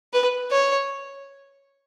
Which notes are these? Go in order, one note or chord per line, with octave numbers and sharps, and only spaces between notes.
B4
C#5